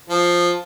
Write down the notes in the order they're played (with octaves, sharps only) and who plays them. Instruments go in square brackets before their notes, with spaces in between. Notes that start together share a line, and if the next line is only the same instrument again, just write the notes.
[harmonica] F3